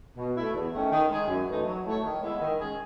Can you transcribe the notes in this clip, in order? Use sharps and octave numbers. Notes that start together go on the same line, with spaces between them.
B2
A3 E4
E2
D#3 A3 C#4
D#3
G#3 D#4 G#4
F#2
E3 A3 D#4
F#3
A3 E4 A4 C#5
D#3
G#3 B3 E4
D#3
G#3 C#4 G#4